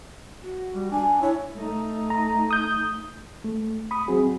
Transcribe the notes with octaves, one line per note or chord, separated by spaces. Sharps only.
F#4
G3
D4 G#5
E4 C#5
A3 D#4
A#5
D#6 G6
A3
B5 D#6
F#3 C4 F#4 G#4